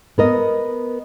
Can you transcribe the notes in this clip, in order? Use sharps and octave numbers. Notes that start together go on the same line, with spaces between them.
B3 A#4 D#5